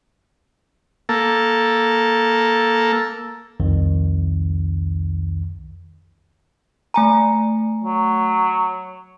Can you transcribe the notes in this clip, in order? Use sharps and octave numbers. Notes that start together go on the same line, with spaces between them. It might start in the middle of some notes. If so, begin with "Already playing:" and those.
A#3 A4
C2 F2 D#3
A3 G#5 A#5
F#3